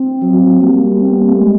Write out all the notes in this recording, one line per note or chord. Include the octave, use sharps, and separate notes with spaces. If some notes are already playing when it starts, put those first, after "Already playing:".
Already playing: C4
F#3
G3 A#3
C4
B3
A#3
A3
G#3